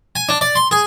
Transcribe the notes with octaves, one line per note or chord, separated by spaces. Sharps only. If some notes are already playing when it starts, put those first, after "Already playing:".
G#5
D4
D5
C6
G#4